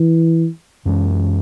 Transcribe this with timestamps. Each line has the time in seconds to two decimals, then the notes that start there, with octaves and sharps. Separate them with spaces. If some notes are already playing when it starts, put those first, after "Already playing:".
Already playing: E3
0.86 F#2 E3 G#3 C#4